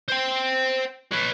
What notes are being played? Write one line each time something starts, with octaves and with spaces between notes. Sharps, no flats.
C5 G5
B4 C#5